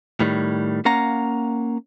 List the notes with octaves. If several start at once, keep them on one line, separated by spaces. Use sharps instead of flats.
A2 D#3 G3
A#3 C#4 F5 F#5 A#5